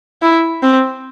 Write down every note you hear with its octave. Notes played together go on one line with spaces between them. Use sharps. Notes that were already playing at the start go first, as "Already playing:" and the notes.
E4
C4